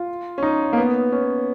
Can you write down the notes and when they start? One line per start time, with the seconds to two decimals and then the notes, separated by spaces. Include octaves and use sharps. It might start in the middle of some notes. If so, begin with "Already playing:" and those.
Already playing: F4
0.38 C#4
0.43 D#4
0.73 A#3
0.78 B3
1.12 C#4